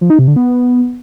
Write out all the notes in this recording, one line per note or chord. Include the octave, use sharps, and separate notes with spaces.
F3
D#4
C3
D3
B3